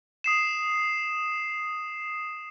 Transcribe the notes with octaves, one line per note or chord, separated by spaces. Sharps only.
D#6 C7 E7